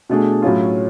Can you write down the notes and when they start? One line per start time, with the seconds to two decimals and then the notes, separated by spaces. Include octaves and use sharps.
0.09 B2 A3 D4 G#4
0.42 A2 F#3 C#4 F4